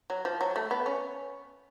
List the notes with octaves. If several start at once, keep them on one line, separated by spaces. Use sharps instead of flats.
F#3
F3
F#3
A3
B3
C#4